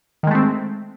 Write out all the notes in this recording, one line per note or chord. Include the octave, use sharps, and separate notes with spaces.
D#3 G#3 A3 C4